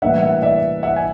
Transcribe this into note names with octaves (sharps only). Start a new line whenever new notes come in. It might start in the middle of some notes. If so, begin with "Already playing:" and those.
A2 E3 G3 A#3 D4 E5 F#5
E5 F#5
D5 E5
E5 F#5
G#5